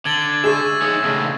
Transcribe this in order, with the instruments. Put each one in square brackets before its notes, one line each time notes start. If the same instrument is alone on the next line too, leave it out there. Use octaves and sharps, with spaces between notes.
[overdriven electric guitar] D3 [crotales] G#6 A6 F#7
[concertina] G#3 E5 [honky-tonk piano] G#4 [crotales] C#6 C7 E7
[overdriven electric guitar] D#4 C#5
A2 C#3